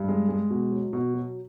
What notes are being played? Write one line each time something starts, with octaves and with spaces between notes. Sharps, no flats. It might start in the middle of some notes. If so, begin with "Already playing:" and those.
Already playing: G2
G#3
G#3
B2
F#3
B2
F#3